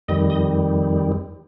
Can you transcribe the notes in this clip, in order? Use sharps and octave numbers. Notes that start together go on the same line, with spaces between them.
F2 D#3 G3 D#5
D#5